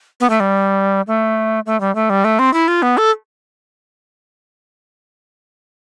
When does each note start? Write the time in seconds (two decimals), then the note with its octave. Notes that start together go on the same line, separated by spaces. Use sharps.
0.20 B3
0.30 A3
0.40 G3
1.07 A3
1.66 A3
1.80 G3
1.95 A3
2.10 G3
2.24 A3
2.39 C4
2.53 E4
2.68 F4
2.82 B3
2.97 A4